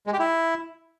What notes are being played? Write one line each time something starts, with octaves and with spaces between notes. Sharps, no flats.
G#3
G4
E4